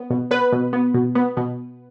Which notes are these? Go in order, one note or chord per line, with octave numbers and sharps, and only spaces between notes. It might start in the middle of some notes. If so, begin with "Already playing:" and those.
Already playing: B3
B2
B3 B4
B2
B3
B2
B3
B2